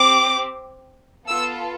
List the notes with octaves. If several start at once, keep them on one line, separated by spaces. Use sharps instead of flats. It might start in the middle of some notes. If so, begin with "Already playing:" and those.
Already playing: C4 G4 D6
B3 F4 A4 E6